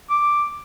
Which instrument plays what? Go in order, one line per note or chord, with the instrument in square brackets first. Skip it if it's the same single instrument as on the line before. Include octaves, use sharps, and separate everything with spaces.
[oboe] D6